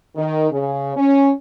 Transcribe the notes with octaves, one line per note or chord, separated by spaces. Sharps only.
D#3
C#3
C#4